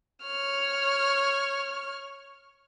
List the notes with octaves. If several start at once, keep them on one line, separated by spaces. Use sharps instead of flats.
C#5 F6